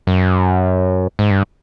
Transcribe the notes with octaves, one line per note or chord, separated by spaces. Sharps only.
F#2
G#2
G2